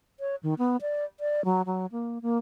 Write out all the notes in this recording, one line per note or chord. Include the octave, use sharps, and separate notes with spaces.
C#5
D#3
B3
D5
D5
F#3
F#3
A#3
A#3